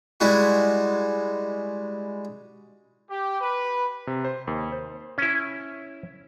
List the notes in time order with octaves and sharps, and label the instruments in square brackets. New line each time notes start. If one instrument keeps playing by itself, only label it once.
[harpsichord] G3 G#3 E4 F#4
[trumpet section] G4
B4
[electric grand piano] C3
C5
D#2
C5
[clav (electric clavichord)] C#4 E4